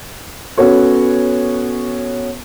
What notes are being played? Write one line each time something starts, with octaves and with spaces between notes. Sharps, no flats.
B3 C#4 F#4 A4 C#5